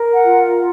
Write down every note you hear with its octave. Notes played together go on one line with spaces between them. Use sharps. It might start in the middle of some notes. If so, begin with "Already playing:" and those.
Already playing: A#4
F#5
F4